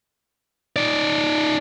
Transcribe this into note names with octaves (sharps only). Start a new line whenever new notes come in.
D#4 D5